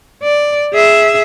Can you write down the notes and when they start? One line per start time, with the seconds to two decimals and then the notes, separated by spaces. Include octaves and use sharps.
0.23 D5
0.73 G#4 E5